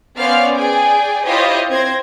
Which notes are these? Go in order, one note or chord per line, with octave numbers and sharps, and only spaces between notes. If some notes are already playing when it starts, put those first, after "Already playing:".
B3 C#4 C5 D5 F5 F6
G#4 D5 G5 G#5
E4 F4 G4 C5 C#5 D#5
C4 C5 G#6 A#6